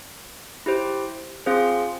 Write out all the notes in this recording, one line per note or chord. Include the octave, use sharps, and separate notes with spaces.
E4 G4 C5
C4 F4 G#4 C5 F5